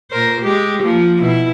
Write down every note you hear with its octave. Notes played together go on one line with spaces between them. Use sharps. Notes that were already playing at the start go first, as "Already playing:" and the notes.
A#2 A#4 C5
G#3 G4
F3 A#3
B2 E4